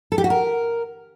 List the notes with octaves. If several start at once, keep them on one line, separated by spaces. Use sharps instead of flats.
A4
G4
F#4
A#4